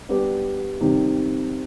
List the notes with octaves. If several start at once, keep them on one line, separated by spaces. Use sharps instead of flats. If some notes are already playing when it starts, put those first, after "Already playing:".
G3 B3 D4 G4 B4
C3 D#3 G3